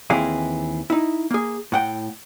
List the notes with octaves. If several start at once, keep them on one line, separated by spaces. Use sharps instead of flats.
D#2 E3 C4 E4 G#4 F5
D#4 E4
A#3 G#4
A2 F#5 G5